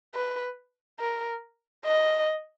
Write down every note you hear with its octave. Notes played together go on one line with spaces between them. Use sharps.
B4
A#4
D#5